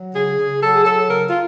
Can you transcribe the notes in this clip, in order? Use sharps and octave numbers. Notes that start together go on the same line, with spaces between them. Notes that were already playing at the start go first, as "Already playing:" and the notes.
Already playing: F#3
C#3 G#4
C#3
F#3 A4
G#4
F#3 A4
C#3 A#4
F4